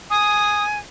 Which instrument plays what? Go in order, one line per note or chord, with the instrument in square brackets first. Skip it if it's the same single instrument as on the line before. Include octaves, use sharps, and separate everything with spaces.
[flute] G#5 [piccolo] D#6